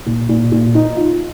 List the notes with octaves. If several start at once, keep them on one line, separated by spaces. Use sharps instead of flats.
A#2
A#2
A#2
D#4
F4